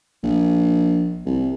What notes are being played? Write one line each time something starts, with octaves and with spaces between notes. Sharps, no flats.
A#1
C2